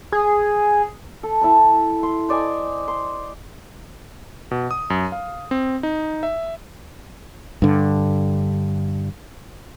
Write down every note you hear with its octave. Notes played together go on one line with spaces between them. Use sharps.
G#4
A4
E4 A5 B5
C6
C5 D5 D#5 G#5
C6
B2
D#6
F#2
F5
C4
D#4
E5
G2 D3